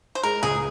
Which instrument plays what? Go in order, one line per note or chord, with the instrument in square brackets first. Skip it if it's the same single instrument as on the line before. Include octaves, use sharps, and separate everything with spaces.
[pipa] C5
[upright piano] G#3 [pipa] A#4
[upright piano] C#2 [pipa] G#4